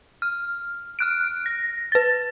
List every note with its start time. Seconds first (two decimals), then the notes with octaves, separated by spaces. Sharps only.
0.22 F6
0.99 F6 F#6 D7
1.46 A#6
1.92 B4 A6